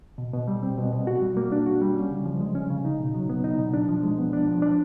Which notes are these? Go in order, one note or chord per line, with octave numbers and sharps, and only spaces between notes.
B2
B2
G3
C4
B2
B2
F#4
G3
A#3
D4
F#4
G3
C#4
C#3
F3
G#3
C#4
C#3
D#4
B2
F#3
B3
D#4
B2
D4
F3
G#3
B3
D4
F3
D4